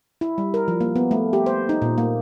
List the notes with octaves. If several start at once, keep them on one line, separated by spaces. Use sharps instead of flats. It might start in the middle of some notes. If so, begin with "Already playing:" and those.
E4
G3
A#4
F3
A#3
B3
A3
G4
C5
D#4
A#2
A#3